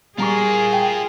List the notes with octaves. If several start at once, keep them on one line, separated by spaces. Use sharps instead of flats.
G3 F4 G#4 A#4 A#5 C#6
G5